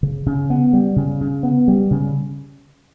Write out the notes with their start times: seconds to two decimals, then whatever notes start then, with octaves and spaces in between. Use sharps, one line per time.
0.03 C#3
0.26 C#3
0.50 B3
0.73 G3
0.96 C#3
1.21 C#3
1.43 B3
1.68 G3
1.91 C#3